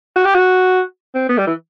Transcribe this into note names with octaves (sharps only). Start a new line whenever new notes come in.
F#4
G4
F#4
C4
B3
G3
E3